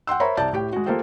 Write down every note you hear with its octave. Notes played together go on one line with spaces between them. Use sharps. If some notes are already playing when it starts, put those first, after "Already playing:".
F#5 G5 C6 E6
A#4 C5 C#5 E5 A#5 B5
C2 D5 A5 G6
A2 G4 G5
G#3 F#4
A#3 F4 G4 A4 C5 G5